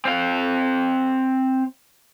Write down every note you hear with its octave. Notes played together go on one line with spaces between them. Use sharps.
C4 F5